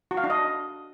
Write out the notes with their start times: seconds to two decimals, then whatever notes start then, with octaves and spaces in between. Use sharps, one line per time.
0.11 F#4
0.17 F5
0.24 D4
0.30 D#5